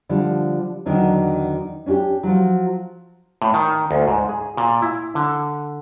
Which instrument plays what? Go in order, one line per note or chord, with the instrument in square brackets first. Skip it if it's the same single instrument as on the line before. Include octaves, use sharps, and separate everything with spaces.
[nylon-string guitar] D3 F3 G3
E2 D3 D#3 F#3 D4
C#4 D4 F#4 G4
F3 F#3
[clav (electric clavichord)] A2
D#3
D2
G#2
G#4
A#2
E4
D3